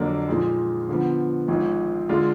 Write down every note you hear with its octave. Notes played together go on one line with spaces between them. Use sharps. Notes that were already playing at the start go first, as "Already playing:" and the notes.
Already playing: F2 D3 F#3 A#3 D4
A#2 F3 G#3 D#4
D3 F3 B3
G#1 G#2 F3
D3 G#3 D4 F4